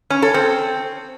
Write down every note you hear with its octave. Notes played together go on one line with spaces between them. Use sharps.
C#4
A4
C4